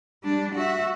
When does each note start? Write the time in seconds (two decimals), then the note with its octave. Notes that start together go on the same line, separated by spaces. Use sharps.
0.23 G3 D4
0.55 F#4 E5